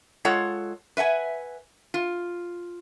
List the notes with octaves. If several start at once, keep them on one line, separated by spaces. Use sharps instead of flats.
G#3 F4 A4 C#5 F#5
B4 E5 F#5 G#5
F4